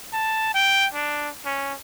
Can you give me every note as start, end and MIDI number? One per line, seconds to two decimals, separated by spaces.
0.13 0.50 81
0.54 0.87 79
0.94 1.29 62
1.45 1.73 61